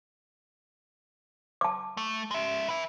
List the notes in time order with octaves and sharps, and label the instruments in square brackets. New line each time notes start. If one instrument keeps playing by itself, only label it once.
[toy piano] A5 D6
[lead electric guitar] A3
G#3 E5
B4 E5